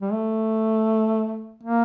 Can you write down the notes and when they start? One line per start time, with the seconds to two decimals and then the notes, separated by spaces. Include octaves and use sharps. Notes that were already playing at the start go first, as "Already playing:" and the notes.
0.01 G3
0.12 A3
1.63 A#3